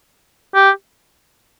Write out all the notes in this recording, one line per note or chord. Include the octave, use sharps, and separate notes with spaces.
G4